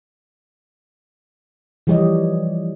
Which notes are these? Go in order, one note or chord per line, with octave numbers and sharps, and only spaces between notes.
E3 F3 G3 G4 C#5 D#5